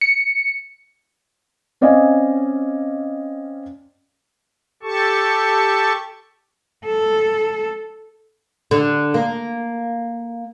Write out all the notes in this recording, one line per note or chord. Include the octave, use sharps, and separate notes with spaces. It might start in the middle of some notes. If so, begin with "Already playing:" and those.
C#7
C4 C#4 D5 D#5 F5 G#5
G4 A4 A5 C#6
A4
D3
A#3